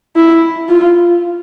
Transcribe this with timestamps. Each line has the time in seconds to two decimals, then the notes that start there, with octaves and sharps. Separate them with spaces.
0.16 E4
0.69 F4